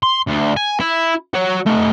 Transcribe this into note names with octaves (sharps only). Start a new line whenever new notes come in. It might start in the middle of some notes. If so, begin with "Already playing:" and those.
C6
D2
G#5
E4
F#4 C#5
A3 D#4